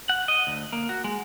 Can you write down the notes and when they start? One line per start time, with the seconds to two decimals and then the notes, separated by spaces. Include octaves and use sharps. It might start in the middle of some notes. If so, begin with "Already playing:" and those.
0.09 F#5
0.28 D#5
0.47 D2
0.73 A#3
0.89 F#4
1.04 G#3